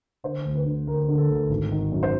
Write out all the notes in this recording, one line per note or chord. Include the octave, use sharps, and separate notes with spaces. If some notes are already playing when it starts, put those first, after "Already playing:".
D3 C5
D2
B4
D3
D2 A#4
D3
A4
D2
G#1
D#3
F#2
C5